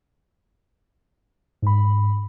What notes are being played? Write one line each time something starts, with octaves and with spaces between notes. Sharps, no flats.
G#2 B5